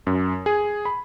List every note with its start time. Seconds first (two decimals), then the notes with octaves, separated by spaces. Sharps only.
0.07 F#2
0.46 G#4
0.85 B5